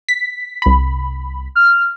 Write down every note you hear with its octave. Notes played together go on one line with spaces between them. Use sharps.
B6
C2 B5
F6